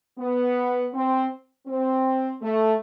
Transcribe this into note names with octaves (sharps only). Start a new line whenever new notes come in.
B3
C4
C4
A3